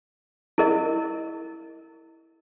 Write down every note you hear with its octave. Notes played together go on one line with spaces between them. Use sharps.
E4 A#4 D#5